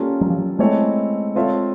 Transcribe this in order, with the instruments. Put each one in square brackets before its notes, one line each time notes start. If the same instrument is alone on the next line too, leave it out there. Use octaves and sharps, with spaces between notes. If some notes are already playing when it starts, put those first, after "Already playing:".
Already playing: [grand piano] G3 A#3 C#4 F4 A4
[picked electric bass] F#3
F3
F#3
[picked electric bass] G#3 [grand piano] A3 C4 E4 A4 C#5
[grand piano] C4 F4 A4 C#5 E5